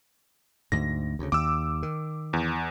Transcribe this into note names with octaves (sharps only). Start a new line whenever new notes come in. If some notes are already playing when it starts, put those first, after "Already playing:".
D2 G#2 A#6
D2 C#3
D#2 D6 E6
D#3
E2